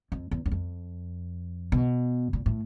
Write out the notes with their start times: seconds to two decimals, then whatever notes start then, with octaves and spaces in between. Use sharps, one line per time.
0.12 F2
0.31 E2
0.46 F#2
0.51 F2
1.72 B2
2.33 A#2
2.46 A2